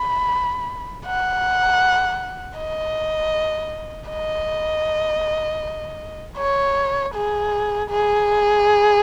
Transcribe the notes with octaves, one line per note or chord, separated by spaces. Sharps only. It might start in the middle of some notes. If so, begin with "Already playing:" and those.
Already playing: B5
F#5
D#5
D#5
C#5
G#4
G#4